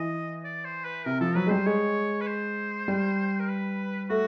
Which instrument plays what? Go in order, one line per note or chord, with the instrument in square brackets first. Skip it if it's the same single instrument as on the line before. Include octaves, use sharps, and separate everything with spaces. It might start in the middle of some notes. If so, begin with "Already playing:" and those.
Already playing: [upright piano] E3 [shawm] D#5
[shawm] D5
C5
B4
[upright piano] C3 [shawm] A#4
[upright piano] F3 [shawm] A4
[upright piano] F#3 [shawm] B4
[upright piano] G#3
[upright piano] G3 [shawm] C5
[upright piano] G#3 [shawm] C#5
[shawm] B4
C5
[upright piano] G3
[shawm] A#4
B4
[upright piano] A3 [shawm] F#4